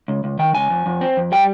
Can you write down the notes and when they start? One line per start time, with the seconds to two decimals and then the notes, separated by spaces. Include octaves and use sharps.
0.08 C#2
0.24 C#2
0.39 D#3 G5
0.55 C#2 G#5
0.70 F2
0.86 F2
1.01 C4
1.17 F2
1.32 G3 G5